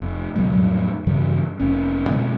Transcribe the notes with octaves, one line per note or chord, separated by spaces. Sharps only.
F1
C#2 B2 F#3 G#3
F2 A2 F#3 G3
G2 C#3 E3 G3
F1 C#4
B2 D3 G#3 C4